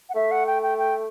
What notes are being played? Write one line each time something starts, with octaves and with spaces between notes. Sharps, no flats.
F#5
A3 E5
F#5
G5
G5
G5